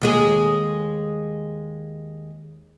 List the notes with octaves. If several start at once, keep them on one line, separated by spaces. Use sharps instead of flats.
D#2 G#3 G#4